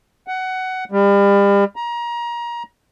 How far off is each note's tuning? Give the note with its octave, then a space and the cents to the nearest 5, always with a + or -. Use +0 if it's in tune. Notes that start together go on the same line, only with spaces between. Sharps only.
F#5 +15
G3 +35
A#5 +25